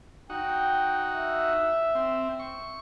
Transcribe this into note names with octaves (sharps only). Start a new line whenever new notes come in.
D#4 F#4 G5
E5
C4
C#6